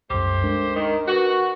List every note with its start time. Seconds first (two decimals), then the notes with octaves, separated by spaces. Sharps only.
0.10 C2 F#2 A3 G4 C5
0.43 G#3 D4 A#4
0.76 D#3
1.08 F#4 A#4 B4